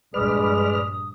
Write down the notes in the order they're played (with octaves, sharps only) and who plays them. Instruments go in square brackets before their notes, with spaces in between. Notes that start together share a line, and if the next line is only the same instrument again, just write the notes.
[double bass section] A#1 G2 [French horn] G#3 [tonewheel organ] B4 D5 F6 [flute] D#6